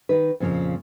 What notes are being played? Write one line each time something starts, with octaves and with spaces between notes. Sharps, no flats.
D#3 D#4 B4
F2 A#2 C#3 E3 F3